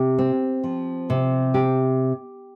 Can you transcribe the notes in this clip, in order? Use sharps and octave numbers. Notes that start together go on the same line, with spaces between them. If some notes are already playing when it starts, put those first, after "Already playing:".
Already playing: C3 G4
C4
F3
C3
G4